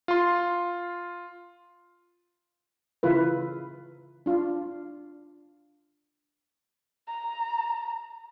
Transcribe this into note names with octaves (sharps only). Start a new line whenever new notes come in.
F4 C6
C#3 E3 E4 F4 A#4 B4
D4 F4
A#5